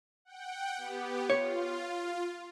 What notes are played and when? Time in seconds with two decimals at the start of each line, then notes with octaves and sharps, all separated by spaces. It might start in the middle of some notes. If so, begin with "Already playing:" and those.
0.25 F#5 G5
0.77 B3 G4
1.30 F4 C#5